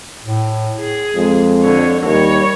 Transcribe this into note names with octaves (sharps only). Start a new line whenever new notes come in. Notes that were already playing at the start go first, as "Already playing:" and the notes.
A2
G#4
F2 G#3
D3 C#5
D#2 G3 A#4 C#5